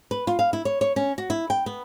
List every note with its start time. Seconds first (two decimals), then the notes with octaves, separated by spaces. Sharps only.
0.11 B4
0.27 F4
0.39 F5
0.53 E4
0.65 C#5
0.81 C#5
0.96 C#4
1.18 F#4
1.30 E4
1.50 G5
1.66 B3